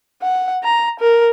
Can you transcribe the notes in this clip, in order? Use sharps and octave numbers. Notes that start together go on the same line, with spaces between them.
F#5
A#5
A#4